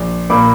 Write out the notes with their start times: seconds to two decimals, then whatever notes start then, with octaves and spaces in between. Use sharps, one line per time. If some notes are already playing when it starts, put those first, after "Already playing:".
Already playing: A#1
0.30 A#2 A#3 B5 D6